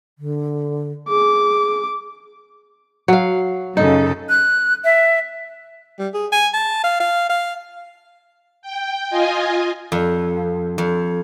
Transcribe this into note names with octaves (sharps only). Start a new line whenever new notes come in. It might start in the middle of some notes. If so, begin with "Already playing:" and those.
D3
G#4 D6
F#3 F5
F#2 C#3 D#4 A4
F#6
E5
G3
G#4
G#5
A5
F5
F5
F5
G5
F4 D#5 G#5
F2
F2